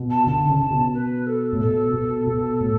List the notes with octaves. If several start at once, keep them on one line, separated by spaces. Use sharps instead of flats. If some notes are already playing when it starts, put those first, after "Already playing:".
Already playing: B2
A5
D3 A5
C#3
B2
B4
A4
A2
B2 A4
B2
B2
A2